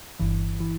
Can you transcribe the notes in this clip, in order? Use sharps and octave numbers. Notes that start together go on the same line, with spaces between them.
G1 G2 E3
E3